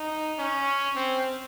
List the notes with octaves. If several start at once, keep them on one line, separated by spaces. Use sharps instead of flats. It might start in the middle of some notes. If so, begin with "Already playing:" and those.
Already playing: D#4
C#4
C4